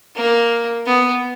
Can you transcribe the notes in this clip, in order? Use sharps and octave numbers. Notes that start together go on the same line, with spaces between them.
A#3
B3